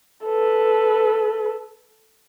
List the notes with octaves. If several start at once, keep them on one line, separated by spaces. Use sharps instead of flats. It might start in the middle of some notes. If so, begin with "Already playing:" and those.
A4 B4